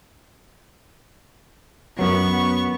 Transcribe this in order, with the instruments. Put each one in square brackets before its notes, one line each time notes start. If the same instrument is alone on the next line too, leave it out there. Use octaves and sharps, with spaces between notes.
[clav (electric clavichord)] F#2 F#3 [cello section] B3 [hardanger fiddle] C#6